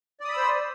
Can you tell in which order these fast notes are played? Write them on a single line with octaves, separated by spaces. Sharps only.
D5 D#6 B5 E6 C5